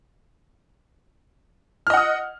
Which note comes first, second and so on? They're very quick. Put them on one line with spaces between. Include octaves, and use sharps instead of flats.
F6 D#5 F#5 D#6